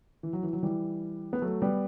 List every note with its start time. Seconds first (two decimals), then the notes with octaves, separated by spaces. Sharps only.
0.23 E3
0.33 F#3
0.43 E3
0.53 F#3
0.63 E3 G3
1.33 B3
1.42 F#3 A3
1.62 G3 B3